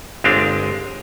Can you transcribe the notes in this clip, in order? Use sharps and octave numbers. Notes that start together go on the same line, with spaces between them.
G1 G#3 C4 D4 F5